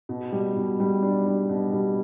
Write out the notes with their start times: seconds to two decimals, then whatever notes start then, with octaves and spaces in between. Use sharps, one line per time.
0.09 B2
0.32 G3
0.56 B2
0.80 G3
1.02 D4
1.26 G3
1.49 B2
1.73 G3